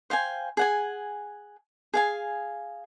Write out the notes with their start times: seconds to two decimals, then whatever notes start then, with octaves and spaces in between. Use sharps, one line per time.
0.10 C5 F5 G5 G#5
0.57 G#4 F#5 G#5
1.94 G#4 F5 G#5